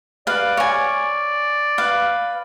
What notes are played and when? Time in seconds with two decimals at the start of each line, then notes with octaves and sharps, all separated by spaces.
0.27 B4 D5 F5
0.57 C#5 G#5
1.78 B4 F5